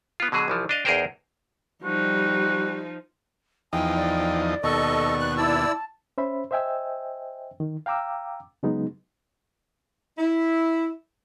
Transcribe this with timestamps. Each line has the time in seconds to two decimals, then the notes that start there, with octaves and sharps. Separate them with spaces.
0.20 B3 F4
0.32 B2 D3 F#3 G#4
0.48 C2 E3 F3
0.69 D4 D#5 F5
0.85 E2 D#4 G#4 A#4 C5 G5
1.84 F3 G3 D#4 F#4
3.73 E2 F3 D#4 G5 G#5
3.96 D5
4.63 D#2 B2 A4 D#5 C#6
5.19 F#6
5.37 E4 D5 A5 E6
6.18 C#4 C5 E5 B5
6.51 C5 D#5 E5 G5 G#5 E6
7.60 D#3
7.86 F5 G5 A#5 D6 E6
8.63 C#3 F#3 G#3 B3 D#4
10.18 E4